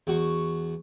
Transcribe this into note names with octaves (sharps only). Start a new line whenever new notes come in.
E2 F#4 C#6